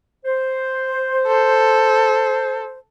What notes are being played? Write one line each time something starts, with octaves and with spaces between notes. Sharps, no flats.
C5
A4